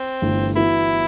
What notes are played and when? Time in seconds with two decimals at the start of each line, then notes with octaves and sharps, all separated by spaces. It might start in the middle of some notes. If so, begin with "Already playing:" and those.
Already playing: C4
0.22 G1 G2 E3 A3
0.56 E3 B3 E4 F#4